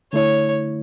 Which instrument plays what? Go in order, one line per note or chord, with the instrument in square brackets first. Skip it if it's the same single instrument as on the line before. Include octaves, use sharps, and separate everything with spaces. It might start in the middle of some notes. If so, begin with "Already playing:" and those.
[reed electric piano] D3 A3 E4 [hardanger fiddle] C#5